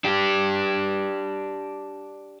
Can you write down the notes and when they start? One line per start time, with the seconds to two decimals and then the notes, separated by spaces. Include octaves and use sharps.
0.04 D4 G4